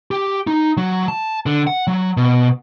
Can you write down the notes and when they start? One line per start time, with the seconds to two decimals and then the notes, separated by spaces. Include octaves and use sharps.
0.11 G4
0.47 D#4
0.77 F#3
1.08 A5
1.46 D3
1.67 F#5
1.87 F#3
2.17 B2